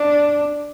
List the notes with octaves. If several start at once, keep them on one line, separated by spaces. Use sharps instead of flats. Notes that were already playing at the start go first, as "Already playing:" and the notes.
Already playing: D4